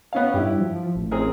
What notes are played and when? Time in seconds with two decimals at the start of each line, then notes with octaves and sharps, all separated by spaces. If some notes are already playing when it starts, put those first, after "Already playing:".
0.13 B3 C#4 F5
0.34 G2 E4 G4
0.60 F3
0.95 A1
1.11 C4 G#4 A#4